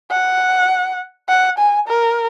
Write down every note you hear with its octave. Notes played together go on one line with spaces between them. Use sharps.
F#5
F#5
G#5
A#4